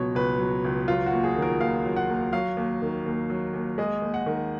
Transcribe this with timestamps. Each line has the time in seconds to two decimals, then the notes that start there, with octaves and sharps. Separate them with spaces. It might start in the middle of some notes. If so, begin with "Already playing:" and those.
Already playing: C#2 B2 F#3 C#5
0.15 C#2 B4
0.39 F#3
0.64 C#2
0.88 F#3 F4
1.06 F#4
1.12 D#2
1.24 G#4
1.36 D#3
1.42 A#4
1.60 D#2 F5
1.85 F#3
1.96 F#5
2.09 D#2
2.33 F#3 F5
2.57 D#2
2.82 D#3
3.06 D#2
3.30 F#3
3.53 D#2
3.78 G#3 D#5
4.02 D#2
4.14 F#5
4.26 D#3